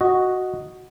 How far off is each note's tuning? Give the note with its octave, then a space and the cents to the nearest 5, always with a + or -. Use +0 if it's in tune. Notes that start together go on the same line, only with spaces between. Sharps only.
F#4 +0 D#5 +0